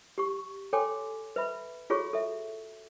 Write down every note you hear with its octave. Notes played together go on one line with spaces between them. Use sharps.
G4 C#6
A4 C#5 G5 G#5 C6 D6
B4 E5 B5
F4 F#4 G#4 A4 C#5 C#6
A4 E5